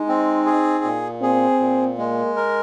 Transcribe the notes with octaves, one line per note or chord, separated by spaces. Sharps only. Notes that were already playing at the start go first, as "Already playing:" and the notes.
Already playing: G#3 D#4
C4
G#4
A#2
C4 G#4
A#2
G#3 A#3
A#4